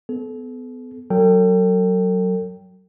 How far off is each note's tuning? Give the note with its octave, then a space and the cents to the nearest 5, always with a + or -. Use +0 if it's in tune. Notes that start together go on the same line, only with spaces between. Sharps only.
B3 +25 A4 -35
F#3 +10 A4 +45 G5 +0